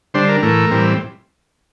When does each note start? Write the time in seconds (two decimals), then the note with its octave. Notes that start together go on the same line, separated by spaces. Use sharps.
0.14 D3 G3 D4 C5
0.28 A#4
0.42 A2 E3 A3 A#4
0.71 A2 E3 G3 C4